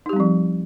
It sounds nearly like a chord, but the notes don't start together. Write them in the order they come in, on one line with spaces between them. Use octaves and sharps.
D#4 G4 G3 C4 F3